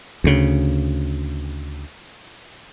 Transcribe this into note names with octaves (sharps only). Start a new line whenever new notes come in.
D2 C#3